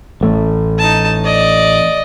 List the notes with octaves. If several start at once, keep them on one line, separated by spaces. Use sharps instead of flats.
A1 A3
D#4 A5
D5 D#5